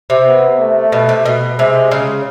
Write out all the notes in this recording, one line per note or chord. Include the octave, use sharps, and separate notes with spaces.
C3
B3
A3
B2
C3
B2
C3 G#3
C#3